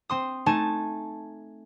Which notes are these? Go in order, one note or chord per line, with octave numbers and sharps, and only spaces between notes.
C4 C6 D#6
A3 D#4 G#5 A5